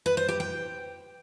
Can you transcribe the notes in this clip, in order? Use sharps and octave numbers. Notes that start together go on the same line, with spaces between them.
B4
C5
G4
G5